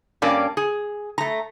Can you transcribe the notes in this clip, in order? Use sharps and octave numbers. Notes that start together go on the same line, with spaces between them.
G2 A#3 C#4 D5 A5
G#4
A3 A#5